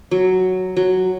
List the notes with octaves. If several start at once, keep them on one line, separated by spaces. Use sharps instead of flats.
F#3
F#3